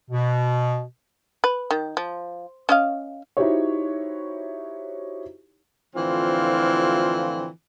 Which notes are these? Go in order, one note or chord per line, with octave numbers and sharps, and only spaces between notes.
B2
B4
D#3
F3
C#4 D#5 F5
D#4 E4 F#4 G4 C5 C#5
A2 D3 E3 F3 C4 F4